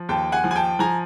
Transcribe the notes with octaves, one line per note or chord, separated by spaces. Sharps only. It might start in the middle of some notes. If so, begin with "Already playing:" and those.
Already playing: F3
D#2 G5 A5
F#5 G#5
F3
G#5
G5 A5
F3 G#5 A#5